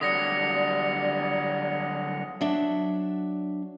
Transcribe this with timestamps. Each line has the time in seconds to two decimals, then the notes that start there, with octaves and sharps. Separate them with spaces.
0.01 D3 F#3 G3 D5 D#6 A#6 C#7
2.41 F#3 D4 E5